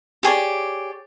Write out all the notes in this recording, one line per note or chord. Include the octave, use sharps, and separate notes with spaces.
G4 G#4 C#5 D5